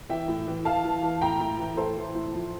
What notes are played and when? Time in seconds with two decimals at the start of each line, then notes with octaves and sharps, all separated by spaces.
0.10 E3 E5 G5
0.28 A2
0.47 E3
0.65 E3 F5 A5
0.84 E3
1.02 E3
1.21 A2 G5 A#5
1.40 A2
1.59 E3
1.77 A2 A4 C5
1.97 E3
2.15 A2
2.33 F3